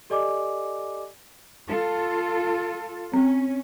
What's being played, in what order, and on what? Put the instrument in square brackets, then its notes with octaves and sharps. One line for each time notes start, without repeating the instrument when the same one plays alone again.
[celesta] G4 A4 D5 D#5 G#5 D6
[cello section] F4 A4
[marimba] C4 [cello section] C#4